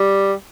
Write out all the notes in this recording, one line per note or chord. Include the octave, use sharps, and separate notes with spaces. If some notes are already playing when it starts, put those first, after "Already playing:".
Already playing: G3